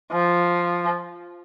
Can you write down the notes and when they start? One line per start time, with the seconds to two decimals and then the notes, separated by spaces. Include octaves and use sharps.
0.12 F3